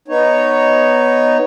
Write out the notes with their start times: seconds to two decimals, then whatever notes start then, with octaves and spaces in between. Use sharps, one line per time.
0.08 B3 D#4 C#5